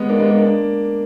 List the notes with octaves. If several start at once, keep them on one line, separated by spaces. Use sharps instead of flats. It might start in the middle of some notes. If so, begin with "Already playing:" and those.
Already playing: G#3 B3
A#3 D4
G#3 B3
A#3 D4
A#3 D4